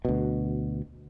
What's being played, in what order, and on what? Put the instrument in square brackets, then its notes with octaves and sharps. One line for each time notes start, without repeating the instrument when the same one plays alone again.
[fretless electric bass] D2 B2